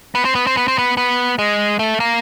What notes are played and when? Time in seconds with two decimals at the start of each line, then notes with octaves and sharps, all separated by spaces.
0.15 B3
0.25 C4
0.35 B3
0.47 C4
0.57 B3
0.68 C4
0.78 B3
0.97 B3
1.39 G#3
1.79 A3
2.00 A#3